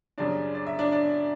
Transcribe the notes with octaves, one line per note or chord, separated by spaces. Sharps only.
F#2 C#3 G3 D4 D5
D5
E5
D4 D5
D4 D5